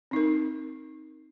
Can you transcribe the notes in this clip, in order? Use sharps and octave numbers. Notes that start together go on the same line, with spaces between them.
C4 D#4 A#4